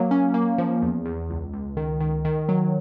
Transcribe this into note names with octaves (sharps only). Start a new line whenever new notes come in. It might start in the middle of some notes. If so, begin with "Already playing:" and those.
Already playing: F#3 A#3
C#4
A#3
F3
E2
E2
C#2
C#2
D#3
D#3
D#3
F#3